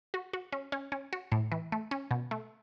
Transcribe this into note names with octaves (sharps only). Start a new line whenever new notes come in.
F#4
F#4
C#4
C#4
C#4
F#4
A2
E3
A3
C#4
B2
A3